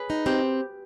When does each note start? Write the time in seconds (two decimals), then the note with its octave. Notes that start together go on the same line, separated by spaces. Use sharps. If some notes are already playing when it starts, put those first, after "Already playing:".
Already playing: G#4 B4
0.10 D#4
0.26 C4 G4